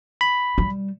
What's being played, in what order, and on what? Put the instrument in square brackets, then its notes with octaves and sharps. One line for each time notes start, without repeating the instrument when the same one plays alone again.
[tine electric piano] B5
[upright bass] G3